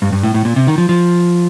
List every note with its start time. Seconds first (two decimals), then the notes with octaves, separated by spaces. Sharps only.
0.02 G2
0.12 G2
0.23 A2
0.34 A2
0.45 A#2
0.56 C3
0.67 D#3
0.78 F3
0.89 F3